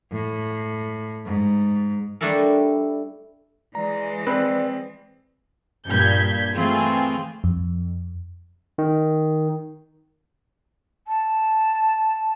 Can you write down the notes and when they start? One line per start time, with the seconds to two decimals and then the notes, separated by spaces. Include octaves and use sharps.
0.11 A2
1.25 G#2
2.21 G3 A3 D4 E4 A4 A#4
3.75 E3 G#3 D5 A#5
4.27 C4 B4 D5
5.87 G2 A#2 G6 G#6 B6
6.56 E3 A3 C4 F4 G#4
7.44 F2
8.78 D#3
11.08 A5